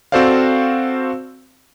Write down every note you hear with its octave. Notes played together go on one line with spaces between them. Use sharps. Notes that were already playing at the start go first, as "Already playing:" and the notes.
C4 F#4 A4 C5 D5 F5